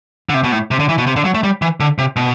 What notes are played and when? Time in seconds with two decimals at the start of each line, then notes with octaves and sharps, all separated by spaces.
0.29 D3
0.34 C3
0.44 B2
0.52 A2
0.71 C3
0.80 D3
0.89 E3
0.98 B2
1.07 C3
1.16 D3
1.25 F#3
1.34 A3
1.43 G3
1.62 E3
1.80 D3
1.98 C3
2.16 B2